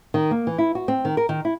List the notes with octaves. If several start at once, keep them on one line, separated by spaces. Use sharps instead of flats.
D#3
A#3
E3
E4
F#4
C4
D#3
A#4
D#3
E4